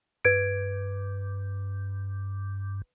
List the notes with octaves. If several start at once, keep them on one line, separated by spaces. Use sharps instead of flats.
G2 B4 G#6 D7